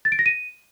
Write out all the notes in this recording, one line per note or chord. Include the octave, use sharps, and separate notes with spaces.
A6
D7
A#6
D#7